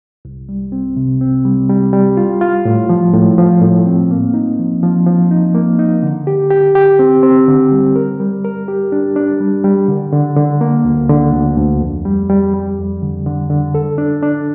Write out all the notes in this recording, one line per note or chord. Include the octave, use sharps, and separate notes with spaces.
C2
G3
C4
C3
C4
G3
G3
G3
F4
F4
A2
F3
A2
F3
A2
C4
A#3
D#4
F3
F3
F3
D#4
A#3
D#4
D3
G4
G4
G4
C4
C4
D3
G3
A#4
G3
A#4
G4
D4
D4
G3
G3
D3
D3
D3
A#3
D2
D3
D2
D2
F2
G3
G3
G3
F2
D3
D3
D3
A4
D4
D4